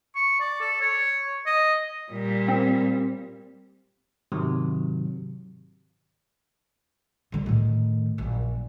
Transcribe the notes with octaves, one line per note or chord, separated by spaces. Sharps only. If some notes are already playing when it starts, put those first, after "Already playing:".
C#6
D5
A4
C#5
D#5
A#2 G3
C4
G#2 C3 D#3 F#3
C2 D3
A2 D#3
A#1 F#2